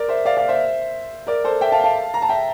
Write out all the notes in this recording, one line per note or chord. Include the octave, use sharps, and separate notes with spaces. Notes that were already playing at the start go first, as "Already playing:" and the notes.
Already playing: A#4 D5
C5 E5
D5 F5
D5 F5
C5 E5
A#4 D5
A4 C5
E5 G5
F5 A5
F5 A5
A#5
A5
E5 G5